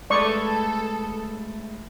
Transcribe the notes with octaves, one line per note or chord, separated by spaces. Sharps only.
G#3 A3 A4 B4 D5 C#6